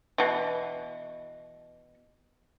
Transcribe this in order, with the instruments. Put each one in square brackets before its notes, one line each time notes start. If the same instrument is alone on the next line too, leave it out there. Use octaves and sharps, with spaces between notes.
[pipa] B2 E3